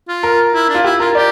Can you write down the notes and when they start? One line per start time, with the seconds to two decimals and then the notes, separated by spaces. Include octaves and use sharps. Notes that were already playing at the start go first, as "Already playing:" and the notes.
0.08 F4
0.23 A#4
0.54 E4
0.69 D4
0.74 F4
0.84 E4 G4
1.00 F4 A#4
1.15 G4 D5